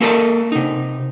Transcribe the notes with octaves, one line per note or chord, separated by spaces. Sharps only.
A#3 A4 A#4 D#5 A5
C3 D#4